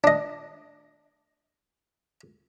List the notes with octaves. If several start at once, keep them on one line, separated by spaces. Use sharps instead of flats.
D4 D#5